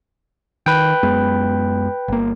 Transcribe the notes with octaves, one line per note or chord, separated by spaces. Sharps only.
D#3 B4 G5
F#2 G#3 B3
G1 A#3